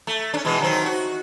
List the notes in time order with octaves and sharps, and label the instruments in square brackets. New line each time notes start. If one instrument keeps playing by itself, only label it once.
[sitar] A3
C#4 D4
B2 E3 G#3
D#3 F#3 C4
F#4